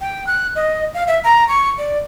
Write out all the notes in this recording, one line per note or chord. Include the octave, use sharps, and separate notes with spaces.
G5
F#6
D#5
F5
E5
A#5
C#6
D5